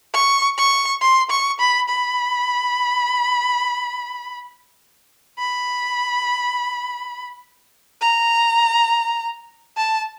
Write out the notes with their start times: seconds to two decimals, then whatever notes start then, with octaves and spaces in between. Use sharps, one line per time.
0.14 C#6
0.58 C#6
1.01 C6
1.31 C#6
1.60 B5
1.89 B5
5.38 B5
8.01 A#5
9.77 A5